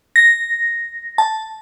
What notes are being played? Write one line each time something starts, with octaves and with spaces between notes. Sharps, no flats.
A#6
A5